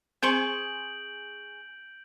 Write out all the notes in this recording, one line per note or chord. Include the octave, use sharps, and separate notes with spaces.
C4 G#4 C5 C6 C#6 G6 D7 F#7